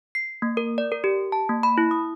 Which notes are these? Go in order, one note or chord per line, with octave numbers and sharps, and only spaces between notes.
C7
A#3
A#4
D5
A#4
G4
A5
A#3
B5
E4
D#6